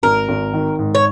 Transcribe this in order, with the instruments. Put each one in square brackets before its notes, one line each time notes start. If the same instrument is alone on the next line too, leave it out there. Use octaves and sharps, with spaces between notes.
[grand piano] G#1 [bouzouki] A#4
[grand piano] G#1
D#3
G#2
[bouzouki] C#5